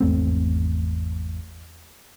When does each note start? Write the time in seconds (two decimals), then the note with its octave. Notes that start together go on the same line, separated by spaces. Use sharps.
0.01 G#1 E2 A3 C4